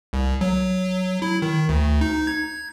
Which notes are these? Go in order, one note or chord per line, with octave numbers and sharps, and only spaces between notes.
C2
F#3
E4
D#3
D2
D#4
G#6